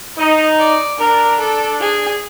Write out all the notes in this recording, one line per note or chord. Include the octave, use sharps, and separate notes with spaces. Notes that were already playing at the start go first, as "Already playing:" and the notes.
D#4 D#5
D5
D4 A#4
A4
G#4